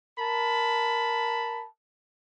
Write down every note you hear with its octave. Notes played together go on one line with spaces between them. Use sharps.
A#4 A5 B5